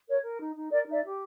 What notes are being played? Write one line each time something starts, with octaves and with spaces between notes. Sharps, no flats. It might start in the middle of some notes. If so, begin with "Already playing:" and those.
A#4 C#5
A#4
D#4
D#4
A#4 D5
D#4
D5 E5
G4